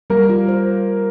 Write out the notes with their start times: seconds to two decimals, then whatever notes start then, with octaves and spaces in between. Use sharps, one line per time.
0.10 G3 A#3 A#4
0.30 F4
0.48 C5